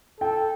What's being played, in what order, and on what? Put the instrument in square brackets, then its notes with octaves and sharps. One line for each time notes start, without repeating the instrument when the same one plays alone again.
[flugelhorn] A4 [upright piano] G5